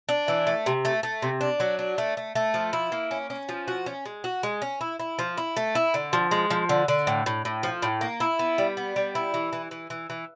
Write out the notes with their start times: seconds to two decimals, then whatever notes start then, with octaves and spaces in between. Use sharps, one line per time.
0.09 D4
0.28 E3
0.47 A3
0.66 C3
0.85 A3
1.03 A3
1.22 C3
1.41 D4
1.60 F#3
1.79 D4
1.98 A3
2.17 A3
2.35 A3
2.54 F3
2.73 E4
2.92 A#3
3.11 C#4
3.30 C#4
3.49 F3
3.68 F#4
3.86 C#4
4.05 G#3
4.24 F#4
4.43 G#3
4.62 C#4
4.81 E4
4.99 E4
5.19 F3
5.38 E4
5.57 A3
5.75 E4
5.94 D3
6.13 F3
6.31 G#3
6.50 F3
6.69 D3
6.88 D3
7.07 A2
7.26 A2
7.45 A2
7.63 F3
7.82 A2
8.01 A#3
8.20 E4
8.39 B3
8.58 G3
8.77 B3
8.96 G3
9.15 E4
9.34 E3
9.53 E3
9.71 E3
9.90 E3
10.10 E3